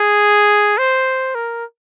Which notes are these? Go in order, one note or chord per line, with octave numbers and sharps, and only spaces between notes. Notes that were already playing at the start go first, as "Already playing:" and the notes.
Already playing: G#4
C5
A#4